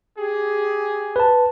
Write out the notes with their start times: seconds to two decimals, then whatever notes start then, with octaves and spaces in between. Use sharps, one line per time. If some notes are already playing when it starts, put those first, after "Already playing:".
0.18 G4 G#4
1.16 B4 A5